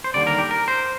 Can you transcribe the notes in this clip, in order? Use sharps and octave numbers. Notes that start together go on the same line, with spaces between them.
C5
D#2 D3 G3 D5
A#4
G4
A#4
C5